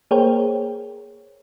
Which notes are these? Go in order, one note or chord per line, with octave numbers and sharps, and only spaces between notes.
A#3 G#4 A#4 C5 C#5 G5